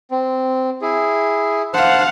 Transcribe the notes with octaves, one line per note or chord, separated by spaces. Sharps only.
C4
E4 G#4
C5 F5 F#5 A5